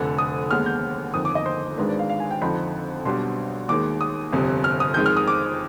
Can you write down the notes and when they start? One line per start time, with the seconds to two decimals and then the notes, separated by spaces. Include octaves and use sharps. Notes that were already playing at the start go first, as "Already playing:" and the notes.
Already playing: F1 F2 D3
0.18 D#6
0.51 D#2 D3 G#3 B3 F6
0.66 G6
1.14 G1 F2 D#3 D#6
1.25 D6
1.35 D#5
1.46 C5
1.78 G#1 G#2 D#3 G#3 D4 B4
1.89 D5
1.99 F5
2.09 F5
2.20 G#5
2.31 G5
2.41 F2 D3 F3 C4 D#4 B5
3.05 B1 B2 G3 B3 D4 C6
3.69 D#2 D#3 G#3 D6
4.01 D#6
4.33 G1 F2 C3 G3
4.64 F6
4.80 D#6
4.94 F2 D#3 G#3 G6
5.06 F6
5.17 D#6
5.28 D6